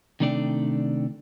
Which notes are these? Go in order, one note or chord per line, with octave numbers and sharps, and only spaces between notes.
C3 D#3 A3 D4 D5 G5